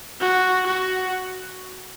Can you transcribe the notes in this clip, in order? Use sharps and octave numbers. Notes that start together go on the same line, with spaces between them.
F#4
F#4